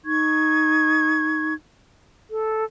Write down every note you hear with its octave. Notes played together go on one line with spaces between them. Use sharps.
D#4 C#6 G#6
A4